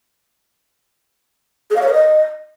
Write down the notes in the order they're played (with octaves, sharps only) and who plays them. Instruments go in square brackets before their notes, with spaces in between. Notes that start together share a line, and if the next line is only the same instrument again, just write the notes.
[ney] G#4
F5
C#5
A#4
D#5